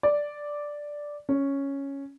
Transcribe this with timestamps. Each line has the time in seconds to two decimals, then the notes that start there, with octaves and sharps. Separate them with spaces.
0.03 D5
1.29 C#4